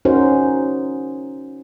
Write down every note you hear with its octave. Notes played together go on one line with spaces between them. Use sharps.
C#4 D#4 F#4 A#4 C5